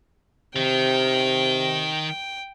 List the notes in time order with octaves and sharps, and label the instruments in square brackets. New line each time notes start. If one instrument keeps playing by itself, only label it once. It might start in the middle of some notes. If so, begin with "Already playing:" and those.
[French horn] C3 [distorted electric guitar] D#3 [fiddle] G5